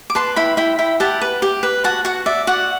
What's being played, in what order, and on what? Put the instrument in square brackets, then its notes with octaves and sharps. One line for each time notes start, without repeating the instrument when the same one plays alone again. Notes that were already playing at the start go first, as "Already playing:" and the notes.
[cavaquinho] D6
B4 A5 C6
E4 G5 B5
E4 G5 B5
E4 G5 B5
G4 F#5 A5
B4
G4
B4
F#4 F#5 A5
F#4 F#5
D5 E5
F#4 F#5